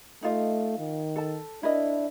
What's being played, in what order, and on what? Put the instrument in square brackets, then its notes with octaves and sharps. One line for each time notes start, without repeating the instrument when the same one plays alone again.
[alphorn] A3 [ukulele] D#4 F4 D#5
[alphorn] D#3
[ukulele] A4 A5
[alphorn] D4 [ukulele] E4 A#4 D#5